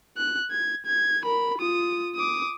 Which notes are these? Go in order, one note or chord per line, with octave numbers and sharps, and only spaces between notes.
F#6
G#6
G#6
A#4 B5
F4 D#6
D6 D#6